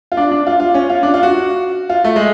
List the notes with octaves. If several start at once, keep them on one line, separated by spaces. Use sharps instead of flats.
F4
D4
D4
F4
F4
C#4
F4
D4
F4
F#4
F4
A3
G#3